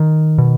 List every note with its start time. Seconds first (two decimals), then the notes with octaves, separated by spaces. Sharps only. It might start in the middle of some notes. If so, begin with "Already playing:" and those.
Already playing: D#3
0.38 B2